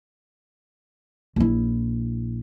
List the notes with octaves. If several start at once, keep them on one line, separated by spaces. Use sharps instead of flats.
A#1 E4